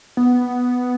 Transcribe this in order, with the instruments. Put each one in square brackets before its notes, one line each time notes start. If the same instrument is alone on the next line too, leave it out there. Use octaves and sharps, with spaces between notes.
[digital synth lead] B3